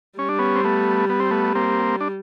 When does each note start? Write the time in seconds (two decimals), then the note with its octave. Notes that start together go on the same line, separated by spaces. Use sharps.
0.19 G3 C#4
0.29 D4
0.39 B3 C#4
0.56 C4
0.64 A3 B3
1.10 B3
1.20 C4
1.31 A3 B3
1.55 A#3 C4
2.01 D4